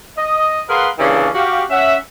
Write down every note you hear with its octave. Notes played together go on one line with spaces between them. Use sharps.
D#5
G#4 A#4 B4 F5 F#5 C6
C#3 E3 G3 A#3 C#4 D4
F#4 G4 F5
C#4 E5 F#5